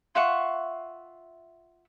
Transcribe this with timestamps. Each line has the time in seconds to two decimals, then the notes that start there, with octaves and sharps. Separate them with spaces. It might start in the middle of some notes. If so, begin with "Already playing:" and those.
0.15 F4 E5 F#5 C#6